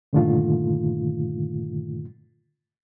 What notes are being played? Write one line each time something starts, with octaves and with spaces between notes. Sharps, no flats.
G2 A#2 D3 D#3 A3 F4